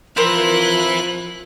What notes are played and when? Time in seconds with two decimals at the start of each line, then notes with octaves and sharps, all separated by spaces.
0.17 F3 C4 E4 A#4 B4 F#6